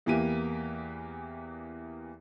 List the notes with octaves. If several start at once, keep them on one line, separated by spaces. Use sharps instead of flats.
E2 E3 A#3 G4 D#7